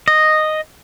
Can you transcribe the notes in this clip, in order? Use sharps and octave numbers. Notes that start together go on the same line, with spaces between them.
D#5